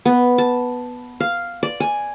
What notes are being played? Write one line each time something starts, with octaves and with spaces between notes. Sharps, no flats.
B3
A5
F5
D5
G#5